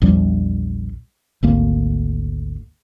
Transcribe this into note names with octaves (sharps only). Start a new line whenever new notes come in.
A#1 E2 F3 G3
G#1 D2 A#3